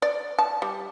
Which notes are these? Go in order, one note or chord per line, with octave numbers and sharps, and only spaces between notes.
D5
A5
G3